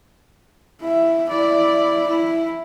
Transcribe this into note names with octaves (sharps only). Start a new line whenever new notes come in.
E4 E5
E4 D5
E4